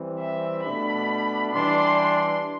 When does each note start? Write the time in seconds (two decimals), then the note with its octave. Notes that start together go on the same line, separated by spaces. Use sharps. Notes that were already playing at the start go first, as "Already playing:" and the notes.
Already playing: E3 G3 C4
0.20 E5
0.64 B2 A3 D4 B5
1.53 E3 G3 D4 C6